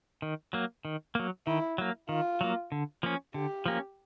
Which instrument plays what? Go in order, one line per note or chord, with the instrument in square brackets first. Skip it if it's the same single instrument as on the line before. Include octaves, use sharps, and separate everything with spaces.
[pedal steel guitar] D#3
F#3 A#3
D#3
F#3 A#3
[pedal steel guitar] D#3 [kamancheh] E4
[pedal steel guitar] F#3 A#3
[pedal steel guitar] D#3 [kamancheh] F4
[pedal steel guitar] F#3 A#3
D3
F3 A#3 C#4
[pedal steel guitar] D3 [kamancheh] G4
[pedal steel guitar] F3 A#3 C#4